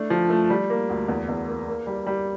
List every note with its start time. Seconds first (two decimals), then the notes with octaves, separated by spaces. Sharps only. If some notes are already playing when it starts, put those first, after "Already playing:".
Already playing: A3 D4
0.10 F3
0.30 A3
0.50 G3
0.70 A#3
0.90 D2
1.08 E2
1.28 E2
1.48 A#3
1.68 A#3
1.87 G3
2.06 G3